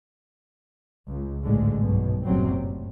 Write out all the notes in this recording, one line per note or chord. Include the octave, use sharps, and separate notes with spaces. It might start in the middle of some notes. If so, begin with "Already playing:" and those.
C#2
A1 D2 G#2 D3 G#3
B1 G2 B2
F#1 A2 C3 F#3 G3 C4
A2